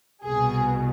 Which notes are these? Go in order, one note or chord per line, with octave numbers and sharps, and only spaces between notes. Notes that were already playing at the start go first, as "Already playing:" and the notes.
C2 B2 G#4